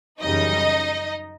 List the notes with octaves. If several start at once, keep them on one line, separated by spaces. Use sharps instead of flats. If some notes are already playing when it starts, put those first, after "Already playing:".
F#2 C#3 E3 G3 D#4 D#5